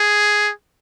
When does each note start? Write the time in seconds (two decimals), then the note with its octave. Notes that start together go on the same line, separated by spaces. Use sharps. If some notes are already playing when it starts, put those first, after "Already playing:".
Already playing: G#4